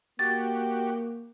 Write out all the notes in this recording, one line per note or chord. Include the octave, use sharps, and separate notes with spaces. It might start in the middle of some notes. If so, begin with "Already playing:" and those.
A#3 F#4 G4 A6